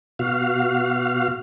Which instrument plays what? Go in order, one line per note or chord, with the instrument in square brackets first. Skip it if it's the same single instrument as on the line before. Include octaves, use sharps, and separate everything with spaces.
[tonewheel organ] B2 F#4 F5